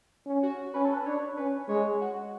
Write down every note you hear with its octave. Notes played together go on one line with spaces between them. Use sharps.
C#4
F#4
C#4 B4
A4
B4
D4 C#5
C#4 B4
G#3 C#5
F#4